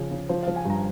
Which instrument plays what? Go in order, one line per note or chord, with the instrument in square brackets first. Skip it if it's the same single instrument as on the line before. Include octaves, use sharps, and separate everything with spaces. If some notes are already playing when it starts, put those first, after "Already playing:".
Already playing: [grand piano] C#3 F3 G#4
C#3
F3 C5
F3 F5
G#5
G2 A#5